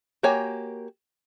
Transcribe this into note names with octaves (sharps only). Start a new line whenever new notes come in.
A#3 F#4 G4 C#5 G#5